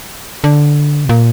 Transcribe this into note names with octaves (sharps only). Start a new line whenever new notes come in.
D3
C3
A#2